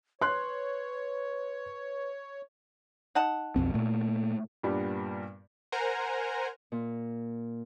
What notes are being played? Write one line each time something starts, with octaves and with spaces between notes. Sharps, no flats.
B4 C#5 C6 F#6
D#4 F#5 A5
B1 F2 C4
A#2 A3
G2 A#2 G3 B3
A#4 C5 F#5 G#5 A#5
A#2